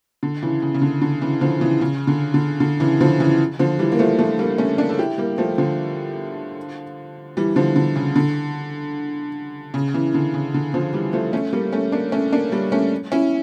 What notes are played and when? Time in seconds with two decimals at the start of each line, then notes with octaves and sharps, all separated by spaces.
0.23 D3
0.43 C#3 E3
0.62 C#3
0.74 C#3
0.82 D3
1.02 D3
1.21 C#3 E3
1.41 D3 F3
1.61 C#3 E3
1.81 C#3
2.07 D3
2.34 D3
2.60 D3
2.80 C#3 E3
3.01 D3 F3
3.20 C#3 E3
3.59 D3 F3
3.79 E3 G3
3.92 A#3
3.99 F3 A3
4.19 F3 A3
4.39 G3 A#3
4.58 A3 C#4
4.78 A#3 D4
4.89 A4
4.99 E4 G4
5.18 G3 A#3
5.38 F3 A3
5.58 D3 F3
7.37 E3 G3
7.56 D3 F3
7.76 D3
7.96 C#3
8.16 D3
9.74 C#3
9.94 C#3 E3
10.14 D3
10.34 C#3
10.54 D3
10.74 D3 F3
10.94 E3 G3
11.13 F3 A3
11.33 A3 C#4
11.53 G3 A#3
11.73 A3 C#4
11.92 A#3 D4
12.12 A3 C#4
12.33 A#3 D4
12.52 G3 A#3
12.72 A3 C#4
13.12 C#4 E4